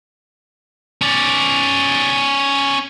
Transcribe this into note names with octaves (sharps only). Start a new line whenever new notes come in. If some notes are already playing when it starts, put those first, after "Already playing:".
C#4 D5